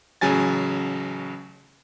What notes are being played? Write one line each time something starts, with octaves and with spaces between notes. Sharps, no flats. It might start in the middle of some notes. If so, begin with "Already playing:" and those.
A1 C#3 F#3 G#5 A6